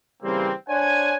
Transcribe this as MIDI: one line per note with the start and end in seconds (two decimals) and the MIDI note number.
0.23 0.52 49
0.23 0.52 52
0.23 0.52 55
0.23 0.52 58
0.23 0.52 60
0.69 1.17 62
0.69 1.17 72
0.69 1.17 73
0.69 1.17 78
0.69 1.17 80